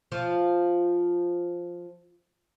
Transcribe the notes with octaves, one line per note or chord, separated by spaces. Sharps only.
F3 F4